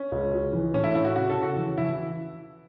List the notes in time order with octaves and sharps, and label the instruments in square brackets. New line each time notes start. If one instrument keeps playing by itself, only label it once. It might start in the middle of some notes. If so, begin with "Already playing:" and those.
Already playing: [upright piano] C#4
[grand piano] C#2
F#4
E3
[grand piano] A2 [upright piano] C#4
[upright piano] E4
[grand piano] C#4 [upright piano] E4
[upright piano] F#4
[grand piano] C#3 [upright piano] F#4
[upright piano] A4
[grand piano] C#3
[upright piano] F#4
[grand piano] E3
[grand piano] E3 [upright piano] E4